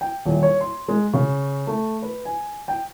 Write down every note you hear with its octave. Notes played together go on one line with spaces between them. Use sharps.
G5
D#1
C#5
C6
G#3
C#3
A3
B4
G#5
G5